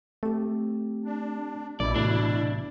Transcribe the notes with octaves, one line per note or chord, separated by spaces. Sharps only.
A3 C4 G4
D4
A#1 B2 E4 D5
A2 C3 E3 B3 D4